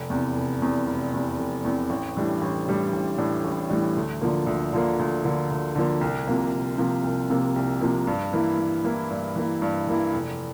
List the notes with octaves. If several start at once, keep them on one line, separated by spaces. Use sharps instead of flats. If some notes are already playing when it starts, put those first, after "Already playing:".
Already playing: F1
E2 C3
F1
E2 C3
F1
E2 C3
F1
E2 C3
A1
A2 E3 G3 D4
A1
A2 E3 G3 D4
A1
A2 E3 G3 D4
A1
A2 E3 G3 D4
D2
D3 F3 A#3
D2
D3 F3 A#3
D2
D3 F3 A#3
D2
D3 F3 A#3
C2
C3 F3 A#3
C2
C3 F3 A#3
C2
C3 F3 A#3
C2
C3 F3 A#3
G2
E3 A#3 E4
G2
E3 A#3 E4
G2
E3 A#3 E4
G2
E3 A#3 E4
F1